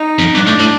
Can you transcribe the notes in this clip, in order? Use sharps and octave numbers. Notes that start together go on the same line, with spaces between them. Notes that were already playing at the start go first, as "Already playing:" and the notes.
Already playing: D#4
F2
G2 D4
A2
A2